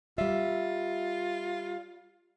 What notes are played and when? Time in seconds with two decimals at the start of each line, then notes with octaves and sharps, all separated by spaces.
0.18 G3 F4 E5